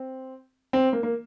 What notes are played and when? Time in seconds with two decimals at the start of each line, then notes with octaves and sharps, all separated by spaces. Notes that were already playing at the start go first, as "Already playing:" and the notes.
Already playing: C4
0.73 C4
0.93 A#3
1.03 A#3